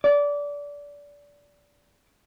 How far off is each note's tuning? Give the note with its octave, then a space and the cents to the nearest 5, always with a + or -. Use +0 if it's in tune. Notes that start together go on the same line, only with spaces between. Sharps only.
D5 -20